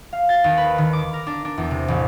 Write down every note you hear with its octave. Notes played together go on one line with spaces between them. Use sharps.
F5
A6
D#2
B4
D#3
D6
A#4
D4
D4
E2
C3
A1